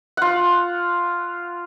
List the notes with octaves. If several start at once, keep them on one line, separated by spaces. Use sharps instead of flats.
F4 F#5